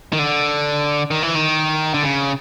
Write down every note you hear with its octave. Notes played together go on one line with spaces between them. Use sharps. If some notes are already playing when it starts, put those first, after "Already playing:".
D#3
D3
D#3
E3
D#3
D3
C#3